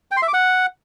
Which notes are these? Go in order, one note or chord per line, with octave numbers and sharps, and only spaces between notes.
G5
C6
E5
D6
F#5